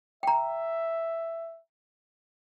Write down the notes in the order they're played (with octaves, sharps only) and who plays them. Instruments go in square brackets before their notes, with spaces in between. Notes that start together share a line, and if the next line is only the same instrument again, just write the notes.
[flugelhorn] E5 [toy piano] G5 A#5